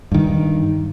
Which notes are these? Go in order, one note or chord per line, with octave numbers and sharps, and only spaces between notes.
G2 D#3